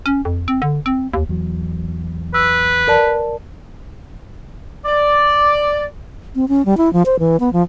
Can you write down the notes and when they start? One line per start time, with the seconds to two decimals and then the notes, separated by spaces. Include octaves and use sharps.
0.06 C#4
0.25 F2
0.48 C4
0.62 D3
0.86 C4
1.14 D#2
1.29 E2 F#3
2.34 B4 E6
2.88 A#4 D5 A5
4.85 D5
6.35 C4
6.49 C#4
6.66 G3
6.77 E4
6.93 F3
7.06 C5
7.20 E3
7.40 B3
7.53 F3